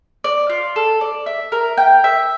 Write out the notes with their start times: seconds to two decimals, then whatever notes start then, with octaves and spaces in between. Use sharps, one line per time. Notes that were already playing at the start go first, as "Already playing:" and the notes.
0.24 D5
0.49 F4
0.76 A4
1.01 D5
1.26 E5
1.52 A#4
1.78 G5
2.04 E5